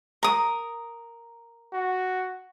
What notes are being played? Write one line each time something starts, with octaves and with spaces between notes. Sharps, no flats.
A#4 D#6
F#4